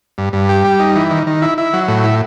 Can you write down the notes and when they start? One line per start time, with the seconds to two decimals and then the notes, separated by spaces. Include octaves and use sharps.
0.18 G2
0.33 G2
0.49 G4
0.65 G3
0.80 D#4
0.96 E3
1.11 D#3
1.27 D#3
1.42 E4
1.58 E4
1.73 F#3
1.88 A2
2.04 E4